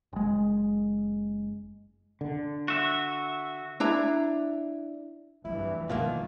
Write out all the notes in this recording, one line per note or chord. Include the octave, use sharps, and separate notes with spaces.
F#1 G#3
D3
F#4 E5
D4 E4 A#5
F1 G2 E3 G3 E4
B2 D#3 F3 G3 A#3 F4